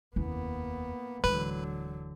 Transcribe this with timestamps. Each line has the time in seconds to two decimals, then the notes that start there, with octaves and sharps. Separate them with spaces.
0.16 F1 D#2 A#3 B3 C#4 E4
1.24 D1 D3 E3 F#3 G#3 B4